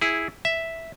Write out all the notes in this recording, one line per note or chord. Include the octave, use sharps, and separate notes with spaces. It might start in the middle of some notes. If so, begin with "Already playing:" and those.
E4 G#4
E5